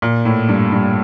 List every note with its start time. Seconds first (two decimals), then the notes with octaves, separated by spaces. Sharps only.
0.02 A#2
0.25 A2
0.49 G2
0.72 G2